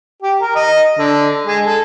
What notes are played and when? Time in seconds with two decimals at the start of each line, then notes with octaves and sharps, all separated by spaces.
0.22 G4
0.41 A#4
0.55 D#5
0.98 D3
1.46 G#3
1.65 A4